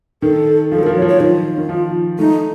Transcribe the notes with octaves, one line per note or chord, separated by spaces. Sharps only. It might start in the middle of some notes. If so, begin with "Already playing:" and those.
D#3 A4
F3 A4
F#3
F3 A#4
F#3 C#5
F3
C#5
D#3 F4
D#3
F3
A3 D#4